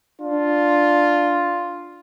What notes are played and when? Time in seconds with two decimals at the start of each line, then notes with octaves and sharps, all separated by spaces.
0.21 D4 F4